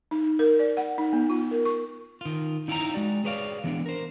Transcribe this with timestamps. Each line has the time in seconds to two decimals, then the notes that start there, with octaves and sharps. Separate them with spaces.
0.11 D#4
0.39 A#4
0.59 D5
0.77 F#5
0.98 D#4
1.13 B3
1.30 F4
1.51 A#4
1.65 C#6
2.21 D#3 F4
2.68 D#4 E4 F5 G5 G#5 A#5
2.94 G#3 F#4 D5
3.25 G#4 B4 C#5 D5 E5 F5
3.64 E3 B3 D4
3.86 A#4 C5